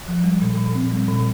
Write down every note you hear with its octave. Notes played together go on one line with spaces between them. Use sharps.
F3
G3
A#2
A#2
C4
G3
A#2